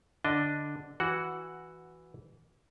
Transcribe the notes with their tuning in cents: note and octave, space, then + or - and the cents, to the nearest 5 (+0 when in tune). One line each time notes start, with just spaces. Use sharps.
D3 +0 D4 +0 D#5 +0
E3 +0 F#4 +0 F#5 -5